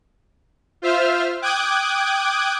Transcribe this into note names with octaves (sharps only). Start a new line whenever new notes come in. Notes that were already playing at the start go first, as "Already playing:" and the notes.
F4 C5 E5 F6
G5 D6 D#6 F#6 G#6